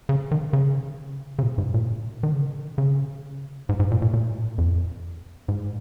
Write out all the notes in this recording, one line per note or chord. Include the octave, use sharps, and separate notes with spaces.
C#3
D#3
C#3
C#3
A#2
G#2
A#2
D#3
C#3
C#3
G#2
G#2
A#2
A#2
A#2
F2
G#2